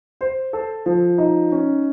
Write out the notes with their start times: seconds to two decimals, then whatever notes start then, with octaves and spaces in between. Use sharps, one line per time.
0.21 C5
0.53 A4
0.86 F3
1.18 D#4
1.52 C#4